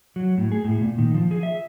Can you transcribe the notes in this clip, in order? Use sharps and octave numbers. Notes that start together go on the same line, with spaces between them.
F#3
A2
G#4
A2
A#2
D#3
F3
G#4
E5